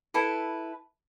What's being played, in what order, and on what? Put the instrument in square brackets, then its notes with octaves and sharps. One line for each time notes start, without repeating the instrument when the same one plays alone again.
[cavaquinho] E4 A4 B4